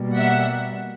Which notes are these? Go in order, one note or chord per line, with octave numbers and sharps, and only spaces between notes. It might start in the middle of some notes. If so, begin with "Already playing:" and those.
Already playing: B2 G3 A#3
E5 F#5